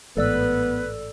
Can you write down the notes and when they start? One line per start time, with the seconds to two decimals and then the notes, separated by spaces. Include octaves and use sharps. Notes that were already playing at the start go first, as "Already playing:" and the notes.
0.17 A1 G#2 B3 A4 B4 D5 E6